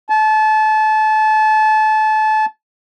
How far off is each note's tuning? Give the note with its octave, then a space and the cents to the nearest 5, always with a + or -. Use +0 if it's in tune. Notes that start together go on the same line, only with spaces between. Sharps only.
A5 -30